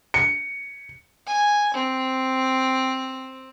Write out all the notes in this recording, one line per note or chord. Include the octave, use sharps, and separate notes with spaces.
C#7
G#5
C4